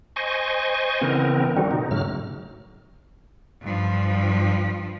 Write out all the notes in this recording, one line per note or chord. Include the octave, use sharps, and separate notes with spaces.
C5 D#5 G#5 C#6
C#3 E3 B3 C4 A#4
D3 D#3 G3 C4 F#4
B2 D#4
G#2 C#3 F#3 A3 F6
G2 F3